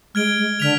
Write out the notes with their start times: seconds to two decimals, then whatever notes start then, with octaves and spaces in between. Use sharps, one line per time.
0.15 G#3 F6 G#6 D7 G7
0.38 G#3
0.60 D3 F6 B6 F7